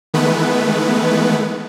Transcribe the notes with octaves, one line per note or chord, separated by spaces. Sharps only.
D#3 E3 G#3 A3 B3 B4